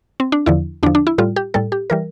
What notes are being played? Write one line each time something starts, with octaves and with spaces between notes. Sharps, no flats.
C4
D4
E2 D3 F3 E4
E2 D3 F3 D4
D4
E4
A2 G3 F4
G4
A2 G3 A4
G4
E3 G3 A#4